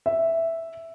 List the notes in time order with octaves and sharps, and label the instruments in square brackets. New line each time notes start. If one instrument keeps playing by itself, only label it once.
[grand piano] E5